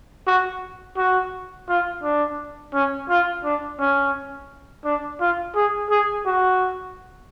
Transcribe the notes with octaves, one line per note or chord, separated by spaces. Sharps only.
F#4
F#4
F4
D4
C#4
F4
D4
C#4
D4
F4
G#4
G#4
F#4